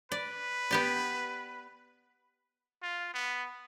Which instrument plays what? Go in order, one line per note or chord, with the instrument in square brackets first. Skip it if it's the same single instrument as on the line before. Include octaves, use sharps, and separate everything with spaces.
[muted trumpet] B4 [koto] D5
[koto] B3 G4 D5
[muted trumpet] F4
B3